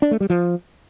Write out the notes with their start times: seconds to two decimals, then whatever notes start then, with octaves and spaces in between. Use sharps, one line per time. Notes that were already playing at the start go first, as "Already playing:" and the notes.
0.02 D4
0.11 A3
0.20 G3
0.30 F3